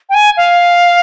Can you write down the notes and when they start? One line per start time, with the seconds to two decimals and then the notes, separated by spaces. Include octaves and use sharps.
0.09 G5
0.14 G#5
0.37 F5